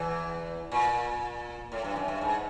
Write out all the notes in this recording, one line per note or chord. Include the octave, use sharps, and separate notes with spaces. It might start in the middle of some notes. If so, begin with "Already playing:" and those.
Already playing: E2 E3
A#2
A2
G2
F#2
G2
G#2